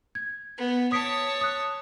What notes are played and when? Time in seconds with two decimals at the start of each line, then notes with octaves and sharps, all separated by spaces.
0.15 G#6
0.58 B3
0.92 C#5 A5 D#6 B6 D7
1.41 D#6 F#6